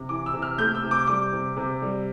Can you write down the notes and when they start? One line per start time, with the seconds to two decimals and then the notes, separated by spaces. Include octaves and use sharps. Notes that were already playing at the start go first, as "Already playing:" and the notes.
Already playing: C3
0.09 E3 D6
0.26 E6
0.34 C3
0.42 F6
0.58 A3 G6
0.75 E6
0.83 C3
0.91 D6
1.08 G3 D6
1.32 C3
1.57 C3
1.82 G3